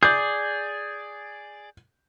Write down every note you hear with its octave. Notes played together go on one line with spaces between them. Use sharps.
G#4 D5 G6